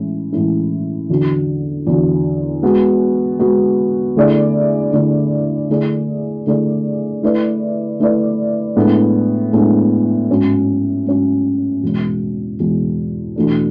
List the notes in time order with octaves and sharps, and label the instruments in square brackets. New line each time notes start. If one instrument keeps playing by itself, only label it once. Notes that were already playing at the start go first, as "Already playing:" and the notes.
Already playing: [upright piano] A2 E3 G#3 C#4 E4
A2 E3 G#3 C#4 E4
E2 D3 F#3
E2 D3 F#3
G#3 B3 F#4
G#3 B3 F#4
D3 A3 E4 G#4 D5
D3 A3 E4 G#4 D5
D3 A3 E4 G#4 D5
D3 A3 E4 G#4 D5
A3 E4 B4 D5
A3 E4 B4 D5
A2 G#3 B3 D4
A2 G#3 B3 D4
G#2 F#3 C#4
G#2 F#3 C#4
E2 B2 G#3
E2 B2 G#3
E2 B2 A3 D4